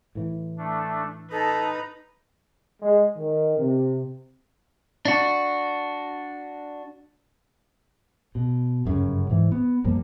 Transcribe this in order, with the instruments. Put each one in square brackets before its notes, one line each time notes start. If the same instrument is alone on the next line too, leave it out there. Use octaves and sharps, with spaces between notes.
[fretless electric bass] A2 E3
[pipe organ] A3 D4
[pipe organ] D#4 [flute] A4 [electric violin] B4 A#5
[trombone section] G#3
D#3
C3
[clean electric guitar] D4 F#4
[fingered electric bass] B2
G1 F#2 A#2 C#3
G#2 E3
B3
F#2 F3 G3 A#3